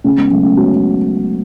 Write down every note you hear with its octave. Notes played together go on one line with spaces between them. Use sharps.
C#3 A3 C#4
G#3 B3
C#3 F#3 A3
A3 C#4
F#3 G#3 B3